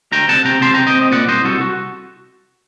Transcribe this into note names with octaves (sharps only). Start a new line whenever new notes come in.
D2 G5 A#5
C3 F#5 A5
C3 G5 A#5
C3 A5 C6
C3 G5 A#5
D#5 G5
C4
D#5
A#2 D5 F#5
C2 C5 D#5
C2 F#4 A4
F#4